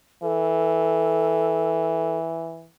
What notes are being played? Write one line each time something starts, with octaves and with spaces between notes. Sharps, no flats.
E3 A4